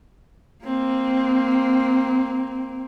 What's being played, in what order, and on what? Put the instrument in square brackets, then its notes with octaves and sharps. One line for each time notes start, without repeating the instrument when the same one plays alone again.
[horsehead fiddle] A#3 C4